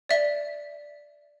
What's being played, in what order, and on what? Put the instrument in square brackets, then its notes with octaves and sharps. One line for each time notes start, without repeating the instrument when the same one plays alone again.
[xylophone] D5 E5